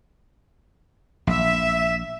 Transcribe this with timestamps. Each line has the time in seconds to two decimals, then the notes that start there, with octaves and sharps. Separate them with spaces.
1.27 A#1 E5